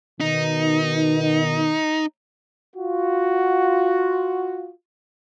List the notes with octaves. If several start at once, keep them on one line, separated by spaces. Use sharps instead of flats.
B2 D#3 D#4
F4 F#4